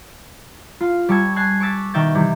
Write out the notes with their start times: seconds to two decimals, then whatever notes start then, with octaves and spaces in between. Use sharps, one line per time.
0.81 F4
1.09 G3 A5 C#6 E6 G#6
1.36 G#5 A5 F#6 G#6 C7
1.60 C#6 D6 E6 A6 B6
1.94 B2 D#3 E5 G5 A6
2.15 C3 E3 G3